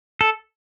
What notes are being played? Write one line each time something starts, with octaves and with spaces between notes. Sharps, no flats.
A4